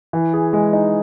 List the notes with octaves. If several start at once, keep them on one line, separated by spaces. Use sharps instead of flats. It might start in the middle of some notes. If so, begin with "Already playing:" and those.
E3
G#4
G#3
D#4